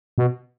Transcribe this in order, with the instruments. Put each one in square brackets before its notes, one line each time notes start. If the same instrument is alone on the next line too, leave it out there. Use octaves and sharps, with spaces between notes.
[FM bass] B2